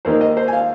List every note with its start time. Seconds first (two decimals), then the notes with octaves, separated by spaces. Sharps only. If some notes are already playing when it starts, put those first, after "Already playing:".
0.05 D#2 D#3 A#3 D#4 C5
0.21 D#5
0.37 C5
0.48 G#5
0.53 F5